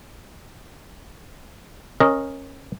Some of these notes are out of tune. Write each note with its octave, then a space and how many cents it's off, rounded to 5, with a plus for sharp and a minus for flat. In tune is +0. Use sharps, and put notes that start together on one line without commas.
C#4 -20 A#4 +0 D#5 +0